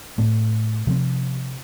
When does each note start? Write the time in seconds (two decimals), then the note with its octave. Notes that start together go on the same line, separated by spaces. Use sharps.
0.18 A2 A3 C4
0.87 C3 F3 C4